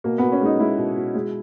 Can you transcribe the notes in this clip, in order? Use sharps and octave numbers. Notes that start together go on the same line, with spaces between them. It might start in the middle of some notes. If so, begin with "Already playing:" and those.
B2 A#3
B2 B3
C#4
G#3 D#4
G#3 E4
B2
B2
G#3